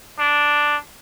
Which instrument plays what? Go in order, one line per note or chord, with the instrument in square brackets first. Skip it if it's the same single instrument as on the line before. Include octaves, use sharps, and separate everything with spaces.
[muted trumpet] D4